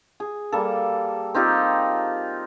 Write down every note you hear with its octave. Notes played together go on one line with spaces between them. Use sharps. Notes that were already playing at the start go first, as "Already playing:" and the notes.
G#4
G3 A#3 A4
C4 D#4 F4 G4